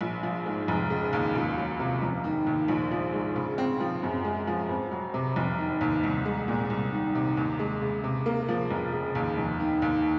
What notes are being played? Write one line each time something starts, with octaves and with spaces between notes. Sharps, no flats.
A#1
F3
G#2
F1
C#3
D#2
C#2
F#3
C3
F1
D#3
D#2
A#1
F3
G#2
C#3
C4
F3
F#2
G#3
F3
F2
F#3
C3
F1
D#3
D#2
C2
G#3
A#2
C2
D#3
C3
D#2
G#3
C#3
C3
A#3
F3
F1
C#3
D#2
F1
D#3
D#2